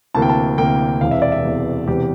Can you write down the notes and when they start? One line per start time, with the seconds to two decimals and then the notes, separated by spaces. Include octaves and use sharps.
0.14 D2 C3 E3 A#3 A5
0.22 G5
0.29 A5
0.58 D2 C3 E3 A#3 G5
1.01 E1 E2 C3 F5
1.11 E5
1.22 D5
1.32 E5
1.44 E1 E2 C3
1.88 E1 E2 C3 G4